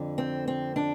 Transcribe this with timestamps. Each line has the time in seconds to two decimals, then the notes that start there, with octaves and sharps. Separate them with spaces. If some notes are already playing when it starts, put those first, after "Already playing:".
Already playing: F2 D3
0.18 C4
0.48 C4
0.76 D4